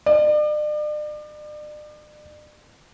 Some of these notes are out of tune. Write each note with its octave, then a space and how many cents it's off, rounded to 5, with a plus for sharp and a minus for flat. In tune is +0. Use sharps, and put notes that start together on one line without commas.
D5 +40